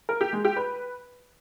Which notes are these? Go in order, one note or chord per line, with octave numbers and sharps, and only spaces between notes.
A#4
G4
G#3
G4
B4